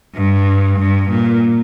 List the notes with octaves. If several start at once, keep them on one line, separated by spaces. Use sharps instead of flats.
G2
G2
A#2